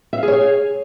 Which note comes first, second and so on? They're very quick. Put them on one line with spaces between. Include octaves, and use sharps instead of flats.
E5 F5 G#4 C#5 G#5